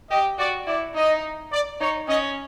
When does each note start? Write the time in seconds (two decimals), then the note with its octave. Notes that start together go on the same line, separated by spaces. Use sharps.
0.10 G4 D#5
0.39 F#4 D5
0.67 E4 D5
0.95 D#4 D#5
1.53 D5
1.81 D#4 C#5
2.09 C#4 D#5